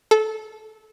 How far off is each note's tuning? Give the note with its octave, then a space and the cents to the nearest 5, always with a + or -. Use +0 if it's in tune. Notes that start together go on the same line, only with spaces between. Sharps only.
A4 -20